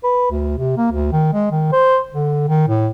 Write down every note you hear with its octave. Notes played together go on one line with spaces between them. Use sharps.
B4
D2
C3
A#3
D2
D#3
G#3
D#3
C5
D3
D#3
A2